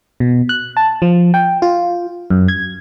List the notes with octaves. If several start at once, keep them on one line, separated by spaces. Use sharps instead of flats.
B2
F#6
A5
F3
G5
F4
F#2
G#6